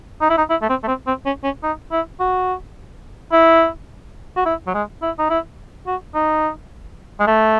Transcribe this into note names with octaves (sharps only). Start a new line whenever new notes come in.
D#4
E4
D#4
E4
A3
C4
A3
C4
C4
C#4
C#4
D#4
E4
F#4
E4
F#4
E4
F#3
G#3
E4
D#4
E4
F#4
D#4
G#3
A3